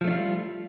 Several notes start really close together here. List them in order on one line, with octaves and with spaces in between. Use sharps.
F3 A3 D4 F4 G3